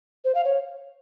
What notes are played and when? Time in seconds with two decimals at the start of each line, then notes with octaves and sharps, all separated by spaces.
0.25 C5
0.35 F5
0.45 C#5